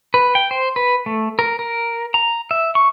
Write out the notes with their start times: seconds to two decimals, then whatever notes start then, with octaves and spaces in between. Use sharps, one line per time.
0.14 B4
0.35 G5
0.51 C5
0.76 B4
1.06 A3
1.39 A#4
1.59 A#4
2.14 A#5
2.51 E5
2.75 C#6